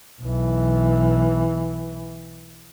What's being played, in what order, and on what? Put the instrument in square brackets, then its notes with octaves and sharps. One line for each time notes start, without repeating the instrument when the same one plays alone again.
[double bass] B1 E3